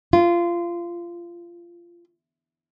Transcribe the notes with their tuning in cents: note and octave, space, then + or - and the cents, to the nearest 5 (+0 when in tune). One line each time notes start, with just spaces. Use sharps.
F4 -20